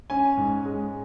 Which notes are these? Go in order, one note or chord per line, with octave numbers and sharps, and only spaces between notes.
C#4 G#5
G#2
G#3